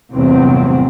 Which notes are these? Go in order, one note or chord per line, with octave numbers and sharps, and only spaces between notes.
G1 E2 A2 C3 F#3 C4